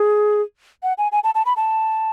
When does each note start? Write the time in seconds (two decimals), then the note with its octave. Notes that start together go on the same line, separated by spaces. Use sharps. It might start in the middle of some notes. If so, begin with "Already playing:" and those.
Already playing: G#4
0.83 F#5
0.98 G#5
1.12 G#5
1.24 A5
1.35 A5
1.46 B5
1.57 A5